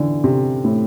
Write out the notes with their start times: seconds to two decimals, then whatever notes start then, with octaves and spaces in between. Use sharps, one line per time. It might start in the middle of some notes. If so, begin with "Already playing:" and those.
Already playing: D3 E3
0.24 C3
0.64 A2